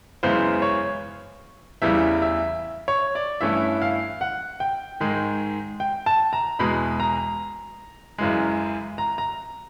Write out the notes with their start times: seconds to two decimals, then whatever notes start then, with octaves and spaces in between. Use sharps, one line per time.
0.23 F#2 C#3 E3 G#3 B3 C5
0.62 C#5
1.82 E2 C#3 E3 G3 E5
2.22 E5
2.88 C#5
3.15 D5
3.41 G2 E3 A3 C#4 E4 E5
3.82 F5
4.21 F#5
4.60 G5
5.00 G#2 D#3 G#3
5.80 G5
6.06 A5
6.33 A#5
6.59 E2 B2 G#3 B5
7.00 A#5
8.18 F#2 C#3 E3 G#3
8.98 A#5
9.18 A#5